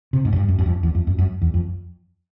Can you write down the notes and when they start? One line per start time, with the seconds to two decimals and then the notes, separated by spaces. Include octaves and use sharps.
0.13 C3
0.25 G#2
0.33 F#2
0.36 G2
0.48 F#2
0.59 F#2
0.66 F2
0.83 E2
0.95 F2
1.07 F#2
1.19 F#2
1.42 E2
1.54 F2